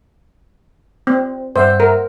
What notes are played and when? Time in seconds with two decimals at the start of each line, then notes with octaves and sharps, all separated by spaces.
1.07 C4
1.56 G2 C5 E5 F#5
1.80 A#4